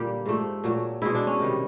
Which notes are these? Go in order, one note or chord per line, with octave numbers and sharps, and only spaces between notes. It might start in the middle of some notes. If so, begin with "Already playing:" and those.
Already playing: A#2 D3 G3 A#3 G4
G#2 F3 A3
A#2 F#3 A3
B2 G#3 E4
D4
C#4
C3 D#3 G3